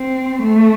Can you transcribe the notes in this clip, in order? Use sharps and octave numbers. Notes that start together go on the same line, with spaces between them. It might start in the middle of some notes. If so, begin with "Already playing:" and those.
Already playing: C4
A3